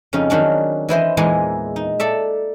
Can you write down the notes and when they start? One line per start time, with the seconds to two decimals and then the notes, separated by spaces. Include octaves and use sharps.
0.13 F2 C#3 C#4 D#4
0.30 D#3 F#3 C#4 D4
0.89 E3 E4 C5 D#5
1.17 E2 A#2 E3 G#3 D#4 G#4
1.76 D#4
2.00 A4 D5 E5